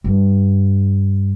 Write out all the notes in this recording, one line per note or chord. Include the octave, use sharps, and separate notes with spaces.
G2